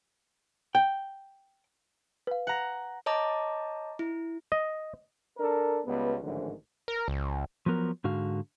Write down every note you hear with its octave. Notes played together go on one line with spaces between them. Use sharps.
G5
B4 F5
F#5 A#5
C#5 D#5 A5 A#5 D6
E4
D#5
D4 A4 A#4
C#2 G3 B3
A1 G#2 D3 D#3 F3
A#4
C#2
F3 F#3 B3 A#4
G#2 D3 F#4 F5